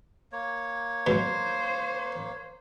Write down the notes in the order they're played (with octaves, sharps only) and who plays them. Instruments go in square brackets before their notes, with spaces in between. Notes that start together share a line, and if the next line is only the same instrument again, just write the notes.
[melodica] A#3 C#5
[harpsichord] G#2 B2 F#3 [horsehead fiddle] C5